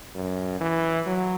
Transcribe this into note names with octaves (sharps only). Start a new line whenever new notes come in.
F#2
E3
F#3